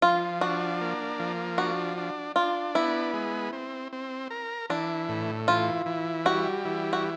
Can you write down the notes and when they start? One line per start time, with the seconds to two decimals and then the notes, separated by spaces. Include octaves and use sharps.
0.02 F3 F4
0.41 D4 F#4
0.81 A#3
1.20 F3
1.58 D4 F#4
1.98 D4
2.36 D4 F4
2.75 B3 E4
3.14 G#3
3.53 C4
3.93 C4
4.30 A#4
4.70 E3 D4
5.09 A2
5.48 E3 F4
5.86 E3
6.25 G3 F#4
6.65 E3
6.93 F#4